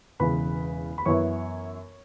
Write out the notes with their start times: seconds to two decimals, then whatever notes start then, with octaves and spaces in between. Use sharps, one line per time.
0.20 E1 E2 C#3 B4 B5
0.98 B5
1.06 F#2 E3 B3 E4 C#5 C#6